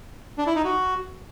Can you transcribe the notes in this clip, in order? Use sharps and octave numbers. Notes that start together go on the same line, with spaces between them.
D4
E4
D#4
F#4